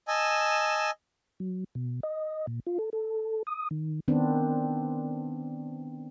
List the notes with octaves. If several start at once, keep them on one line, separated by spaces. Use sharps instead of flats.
D#5 G#5 A5 E6
F#3
B2
D#5
A#2
F4
A4
A4
D#6
D#3
D#3 B3 C4 D4